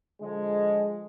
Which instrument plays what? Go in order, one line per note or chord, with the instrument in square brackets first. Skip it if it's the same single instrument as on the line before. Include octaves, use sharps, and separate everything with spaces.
[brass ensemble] D3 F3 G#3